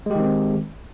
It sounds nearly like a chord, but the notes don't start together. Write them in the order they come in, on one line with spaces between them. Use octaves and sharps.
G#3 G4 D#3 C4